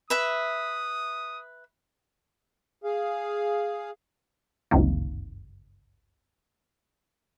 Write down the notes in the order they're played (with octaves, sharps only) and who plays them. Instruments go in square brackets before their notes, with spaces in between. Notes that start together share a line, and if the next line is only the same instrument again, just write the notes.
[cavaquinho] B4 E5 B5 [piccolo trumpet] D#6
[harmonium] G#4 F5
[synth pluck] G1 C#2 F#2 C3 D#3 A#3